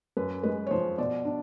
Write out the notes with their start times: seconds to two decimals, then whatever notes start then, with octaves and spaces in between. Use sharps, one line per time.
0.17 F#2 B4
0.43 G#3 B4
0.67 C#5
0.71 F3 C5
0.98 B2 D5
1.25 D4